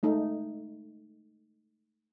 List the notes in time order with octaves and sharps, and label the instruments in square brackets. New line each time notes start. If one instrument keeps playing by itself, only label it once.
[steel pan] G#3 A3 D#4